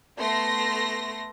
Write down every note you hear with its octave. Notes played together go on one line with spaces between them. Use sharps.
A3 B3 C6 A#6